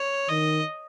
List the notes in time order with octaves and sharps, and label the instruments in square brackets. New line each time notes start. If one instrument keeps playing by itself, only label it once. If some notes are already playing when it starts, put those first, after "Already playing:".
Already playing: [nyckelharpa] C#5
[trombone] D#3 [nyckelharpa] D#5